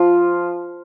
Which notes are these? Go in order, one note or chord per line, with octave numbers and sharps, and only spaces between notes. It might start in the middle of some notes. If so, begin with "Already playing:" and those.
Already playing: F3 F4